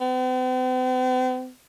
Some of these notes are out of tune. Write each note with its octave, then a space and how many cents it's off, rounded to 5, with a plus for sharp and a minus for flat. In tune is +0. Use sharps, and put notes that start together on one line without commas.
C4 -45